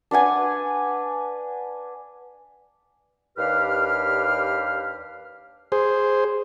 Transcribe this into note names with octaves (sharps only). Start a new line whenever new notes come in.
D4 B4 F#5 G#5
D#2 D4 G4 B4 F5 F6
G#4 C5